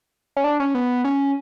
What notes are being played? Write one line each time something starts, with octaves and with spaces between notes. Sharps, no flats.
C#4
D4
C#4
B3
C#4